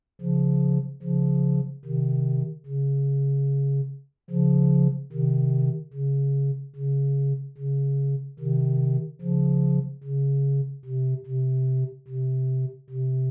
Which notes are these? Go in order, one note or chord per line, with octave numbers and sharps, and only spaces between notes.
C#3 F3
C#3 F3
C3 D#3
C#3
C#3 F3
C3 D#3
C#3
C#3
C#3
C3 D#3
C#3 F3
C#3
C3
C3
C3
C3